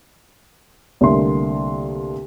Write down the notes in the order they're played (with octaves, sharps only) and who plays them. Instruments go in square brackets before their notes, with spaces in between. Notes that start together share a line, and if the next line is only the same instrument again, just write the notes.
[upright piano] C2 D3 A3 A#3 C6